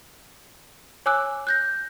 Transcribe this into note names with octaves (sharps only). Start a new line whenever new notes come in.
C#5 G#5 D6 E6 F#6
F#6 G6 A#6